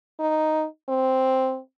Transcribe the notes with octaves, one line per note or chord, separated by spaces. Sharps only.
D#4
C4